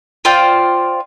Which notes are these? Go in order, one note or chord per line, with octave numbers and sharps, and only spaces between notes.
F4 C5 D5 G5